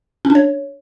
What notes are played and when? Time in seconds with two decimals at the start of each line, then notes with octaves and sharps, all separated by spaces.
0.25 C#4
0.30 D4
0.35 C#5